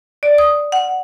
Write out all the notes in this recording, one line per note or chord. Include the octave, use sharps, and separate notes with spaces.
D5
D#6
F#5